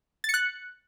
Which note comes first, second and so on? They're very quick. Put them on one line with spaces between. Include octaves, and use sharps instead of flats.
A6 C#7 F#6